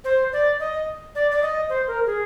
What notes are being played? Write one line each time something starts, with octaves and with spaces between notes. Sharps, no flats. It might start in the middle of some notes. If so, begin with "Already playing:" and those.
C5
D5
D#5
D5
D5
D#5
C5
A#4
G#4